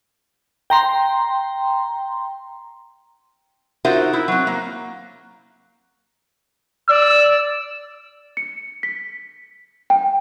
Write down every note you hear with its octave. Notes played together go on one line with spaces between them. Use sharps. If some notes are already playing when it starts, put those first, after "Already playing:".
G5 A#5 C6
D#4 F4 F#4 A#4 C5 E5
E4
F#3 C4
A#3
D5 E6
C#7
B6
G5